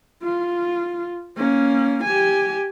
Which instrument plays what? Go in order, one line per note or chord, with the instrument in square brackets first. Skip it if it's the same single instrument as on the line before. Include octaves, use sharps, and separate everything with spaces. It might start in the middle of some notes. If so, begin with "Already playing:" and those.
[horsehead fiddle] F4
A#3 C#4
G4 G#5